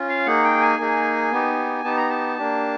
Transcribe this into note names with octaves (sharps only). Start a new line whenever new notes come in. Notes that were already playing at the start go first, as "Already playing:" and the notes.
Already playing: C#4 F4
F5
A#3 D#4 G#4 F#5
G5
G#5
A#3 D#4 G#4
B3 D#4 G4
B3 D#4 G4 A5
A#5
A5
A#3 D4 G4